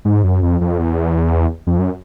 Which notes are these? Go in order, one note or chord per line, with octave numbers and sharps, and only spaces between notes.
G#2
F#2
F2
F2
E2
F2
F#2